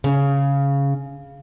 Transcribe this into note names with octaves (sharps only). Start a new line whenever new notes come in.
C#3